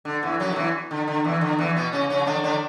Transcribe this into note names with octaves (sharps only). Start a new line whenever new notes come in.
D3
E2 E3
F#2 F#3
D3
E2 E3
D3
D3
E2 E3
D3
E2 E3
B2 B3
C#3 C#4
C#3 C#4
D3 D4
D3 D4